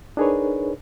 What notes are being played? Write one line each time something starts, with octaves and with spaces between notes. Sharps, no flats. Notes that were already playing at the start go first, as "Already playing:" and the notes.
D4 D#4 G#4 A#4 B4 C#5